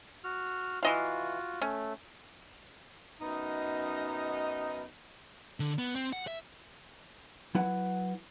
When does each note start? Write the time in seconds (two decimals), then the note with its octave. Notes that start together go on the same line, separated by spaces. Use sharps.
0.24 F#4 F6
0.83 E3 F4 F#4 D#5 F5
1.62 A3 C#4
3.21 F#2 B3 D#4
5.60 D3
5.78 B3
5.95 C4
6.13 F#5
6.27 E5
7.55 F#3 E4 B4 F#5